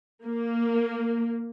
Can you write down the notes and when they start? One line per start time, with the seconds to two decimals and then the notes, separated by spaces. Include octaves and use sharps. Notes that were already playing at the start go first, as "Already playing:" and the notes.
0.24 A#3